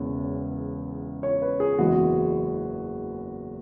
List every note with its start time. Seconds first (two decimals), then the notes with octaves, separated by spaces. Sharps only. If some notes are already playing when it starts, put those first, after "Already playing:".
Already playing: E1 E2 C#3
1.23 C#5
1.42 B4
1.60 G#4
1.78 F#1 E2 E3 G#3 F#4